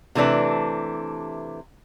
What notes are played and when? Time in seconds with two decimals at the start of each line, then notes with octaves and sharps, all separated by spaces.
0.15 C3 E3 A3 D4 B4